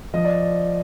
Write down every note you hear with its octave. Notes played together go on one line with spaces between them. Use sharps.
F3 D#5
D5